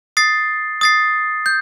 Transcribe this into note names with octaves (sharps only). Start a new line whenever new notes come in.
D#6 A6 C7
D#6 A6 C7
G6